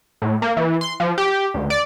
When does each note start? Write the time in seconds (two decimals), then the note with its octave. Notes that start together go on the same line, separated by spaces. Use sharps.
0.22 A2
0.42 A#3
0.57 E3
0.81 C6
1.00 F3
1.18 G4
1.54 D2
1.70 D5